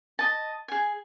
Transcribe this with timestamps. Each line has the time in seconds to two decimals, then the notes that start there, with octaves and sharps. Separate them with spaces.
0.19 D#5 A5
0.68 G#4 G#5